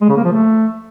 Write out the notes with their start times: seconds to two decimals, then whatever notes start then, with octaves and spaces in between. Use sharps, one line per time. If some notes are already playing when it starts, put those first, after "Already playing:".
0.01 G#3
0.09 C#3
0.17 A#3
0.24 F3
0.32 A3